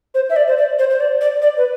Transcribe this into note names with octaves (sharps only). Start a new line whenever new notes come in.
C5
E5
D5
C5
D5
C5
C5
D5
D5
D5
B4